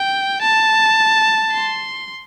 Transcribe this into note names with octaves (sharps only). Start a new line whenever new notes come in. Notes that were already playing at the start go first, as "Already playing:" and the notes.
Already playing: G5
A5
C6